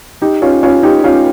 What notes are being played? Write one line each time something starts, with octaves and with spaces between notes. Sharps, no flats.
D#4 G4
C#4 F4
C#4 F4
D#4 G4
C#4 F4